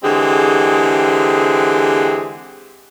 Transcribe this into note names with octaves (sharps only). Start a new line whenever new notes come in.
D3 E3 G#3 C4 G4 G#4